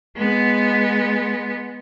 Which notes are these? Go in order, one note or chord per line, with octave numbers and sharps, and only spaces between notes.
G#3 B3